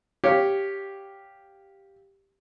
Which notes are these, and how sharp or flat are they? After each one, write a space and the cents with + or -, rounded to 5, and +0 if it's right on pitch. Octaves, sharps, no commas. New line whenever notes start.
G4 +0 C#5 +0 F5 +0